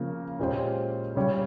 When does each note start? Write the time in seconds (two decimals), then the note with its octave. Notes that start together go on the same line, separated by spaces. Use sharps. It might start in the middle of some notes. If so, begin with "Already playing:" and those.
Already playing: C#3 F3 A#3
0.39 A#2 G#3 C#4 G4 C5
1.15 C#3 G3 C#4 G4 C#5